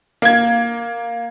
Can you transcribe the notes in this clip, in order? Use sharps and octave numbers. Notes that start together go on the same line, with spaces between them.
A#3 G#6